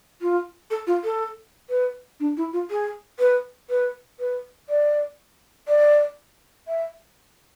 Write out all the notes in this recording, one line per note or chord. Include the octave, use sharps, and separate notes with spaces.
F4
A4
F4
A4
B4
D4
E4
F4
G#4
B4
B4
B4
D5
D5
E5